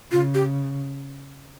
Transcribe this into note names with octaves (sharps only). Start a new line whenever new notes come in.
C#3 F4
G4